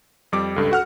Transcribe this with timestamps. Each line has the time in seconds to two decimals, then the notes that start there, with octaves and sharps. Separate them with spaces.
0.32 F2 G3 D6
0.56 C#2 G2 A4
0.71 F#4 F#5 F6